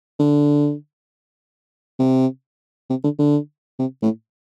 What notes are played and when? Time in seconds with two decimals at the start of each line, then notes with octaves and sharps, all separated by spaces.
0.19 D3
1.99 C3
2.90 C3
3.04 D3
3.19 D3
3.79 C3
4.02 A2